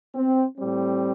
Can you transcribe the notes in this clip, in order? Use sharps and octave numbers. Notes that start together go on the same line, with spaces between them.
C4
A2 G3 C4